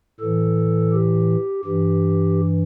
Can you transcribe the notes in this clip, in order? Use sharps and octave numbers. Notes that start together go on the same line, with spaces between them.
A2 E3 A4
G4
G2 E3 G4